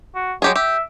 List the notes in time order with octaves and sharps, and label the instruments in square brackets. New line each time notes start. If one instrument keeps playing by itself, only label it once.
[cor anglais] F#4
[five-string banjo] F#3 G4 G#4 [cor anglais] G#3
[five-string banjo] G4 [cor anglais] E5